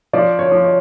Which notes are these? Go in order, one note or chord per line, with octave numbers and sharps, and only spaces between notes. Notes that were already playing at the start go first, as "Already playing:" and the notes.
F3 D5
C#5
F3
C#5